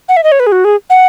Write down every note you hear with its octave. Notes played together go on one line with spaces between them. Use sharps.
F#5
E5
D#5
C#5
B4
G#4
F#4
G#4
F#5